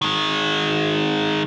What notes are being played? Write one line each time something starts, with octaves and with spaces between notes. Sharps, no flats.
D#3 G#3